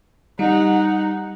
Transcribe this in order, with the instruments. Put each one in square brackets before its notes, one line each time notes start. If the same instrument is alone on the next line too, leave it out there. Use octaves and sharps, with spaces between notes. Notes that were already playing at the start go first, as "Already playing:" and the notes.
[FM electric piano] G3 [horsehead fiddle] D#4 F#5